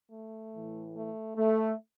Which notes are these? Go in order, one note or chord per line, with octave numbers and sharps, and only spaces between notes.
A3
A2 E3
A3
A3